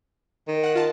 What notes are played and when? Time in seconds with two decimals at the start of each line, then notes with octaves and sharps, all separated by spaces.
0.48 D#3
0.64 F#5 F#6
0.75 F4 A5